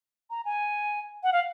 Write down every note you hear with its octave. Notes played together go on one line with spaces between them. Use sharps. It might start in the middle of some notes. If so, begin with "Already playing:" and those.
A#5
G#5
F#5
F5